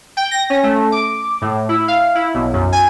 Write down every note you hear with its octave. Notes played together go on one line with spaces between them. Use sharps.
G5
A#6
C#4
A3
D6
A2
E4
F5
E4
B1
F#2
G#5